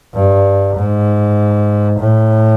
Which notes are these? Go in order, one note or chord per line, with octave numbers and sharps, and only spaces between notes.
G2
G#2
A2